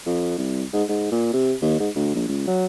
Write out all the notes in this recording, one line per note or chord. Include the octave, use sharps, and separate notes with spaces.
F2
C2
G#2
G#2
A#2
C3
D#2
G#2
D2
A#1
C#2
F#3